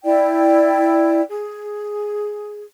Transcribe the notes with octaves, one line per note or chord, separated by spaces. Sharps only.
E4 D5 G5
G#4